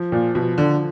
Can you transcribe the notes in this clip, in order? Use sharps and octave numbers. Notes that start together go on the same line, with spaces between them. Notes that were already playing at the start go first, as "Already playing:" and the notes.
Already playing: F3
A#2
B2 F3
D3